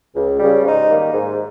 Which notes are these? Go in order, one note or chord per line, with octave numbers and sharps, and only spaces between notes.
C#2
C#3 G3
G#2 D#4
D#3 G3 A#3
G#2